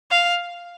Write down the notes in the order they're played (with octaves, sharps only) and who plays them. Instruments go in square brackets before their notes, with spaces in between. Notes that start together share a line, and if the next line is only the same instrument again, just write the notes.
[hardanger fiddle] F5